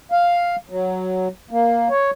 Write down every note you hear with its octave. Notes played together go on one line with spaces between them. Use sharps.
F5
F#3
A#3
C#5